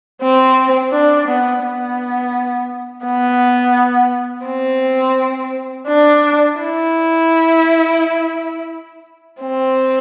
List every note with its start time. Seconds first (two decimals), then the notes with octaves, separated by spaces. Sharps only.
0.22 C4
0.93 D4
1.28 B3
1.63 B3
3.05 B3
4.47 C4
5.87 D4
6.59 E4
9.41 C4